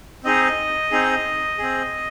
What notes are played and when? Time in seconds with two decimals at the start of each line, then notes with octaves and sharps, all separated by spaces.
0.24 C4 D#4 G#4 D#5
0.91 C4 D#4 G#4
1.58 C4 G#4